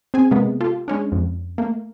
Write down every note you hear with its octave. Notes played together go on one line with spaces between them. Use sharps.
C4 G#4 G#5
C3 G#3 A#3 B3
F4 G4 A4
G#3 C#4 D4
F2
A3 A#3